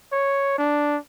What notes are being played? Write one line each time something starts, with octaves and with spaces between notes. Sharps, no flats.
C#5
D4